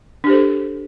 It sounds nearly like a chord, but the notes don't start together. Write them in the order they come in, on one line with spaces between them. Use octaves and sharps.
D4 G4 C5 A4